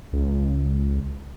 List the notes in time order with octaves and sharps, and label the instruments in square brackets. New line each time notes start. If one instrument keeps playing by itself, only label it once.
[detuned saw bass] C#2